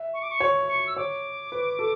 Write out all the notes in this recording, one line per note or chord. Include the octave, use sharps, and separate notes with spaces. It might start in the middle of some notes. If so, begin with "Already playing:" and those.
Already playing: E5
C#6
D6
C#6
C#5
C#6
E6
C#5 D6
B4
A4